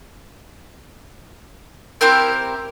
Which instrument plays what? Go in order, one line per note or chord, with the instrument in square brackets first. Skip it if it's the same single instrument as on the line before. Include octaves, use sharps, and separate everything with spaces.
[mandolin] C4 E4 G4 A#4